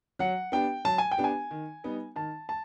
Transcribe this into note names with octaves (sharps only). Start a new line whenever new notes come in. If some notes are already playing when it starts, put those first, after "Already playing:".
F#3 F#5
B3 D4 G4 G5
F#3 A5
G#5
G5
B3 D4 G4
G#5
D#3
G3 B3 D#4
D#3 A5
A5